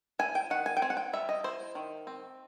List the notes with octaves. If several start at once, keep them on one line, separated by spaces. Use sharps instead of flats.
E4 G#5
G5
D#3 F#5
G#5
G5
C4 G#5
F#5
G5
G3 E5
D#5
E4 C5
D#3
C4